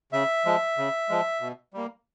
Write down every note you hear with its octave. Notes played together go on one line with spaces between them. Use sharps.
C#3 E5
F3 G#3
C#3
F3 G#3
B2
G3 A#3